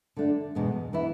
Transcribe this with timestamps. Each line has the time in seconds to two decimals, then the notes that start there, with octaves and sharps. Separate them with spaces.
0.17 D3 A3 D4
0.55 E2 B2 G#3
0.93 E3 B3 E4